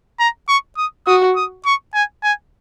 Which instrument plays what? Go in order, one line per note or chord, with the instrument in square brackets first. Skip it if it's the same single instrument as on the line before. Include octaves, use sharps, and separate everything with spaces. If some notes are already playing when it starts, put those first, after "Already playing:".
[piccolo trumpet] A#5
C#6
D#6
[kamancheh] F#4 [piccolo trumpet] D#6
[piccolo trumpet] D#6
C#6
G#5
G#5